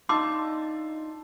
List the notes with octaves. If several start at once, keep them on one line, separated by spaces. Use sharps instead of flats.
D4 D#4 F4 A5 C6 D6 E6 C7